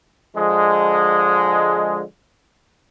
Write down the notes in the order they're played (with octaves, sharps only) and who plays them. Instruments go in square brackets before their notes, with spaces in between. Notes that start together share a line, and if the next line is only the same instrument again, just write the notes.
[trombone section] D3 F3 G#3